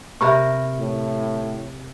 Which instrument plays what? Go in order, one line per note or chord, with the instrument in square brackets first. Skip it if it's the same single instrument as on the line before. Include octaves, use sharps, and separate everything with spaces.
[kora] C3 A#4 [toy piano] E5 B5 C#6
[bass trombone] A2